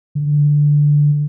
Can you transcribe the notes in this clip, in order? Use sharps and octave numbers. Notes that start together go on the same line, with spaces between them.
D3